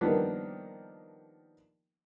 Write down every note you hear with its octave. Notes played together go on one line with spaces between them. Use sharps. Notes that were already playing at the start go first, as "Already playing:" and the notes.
D#3 F3 G3 A#3 B3 D4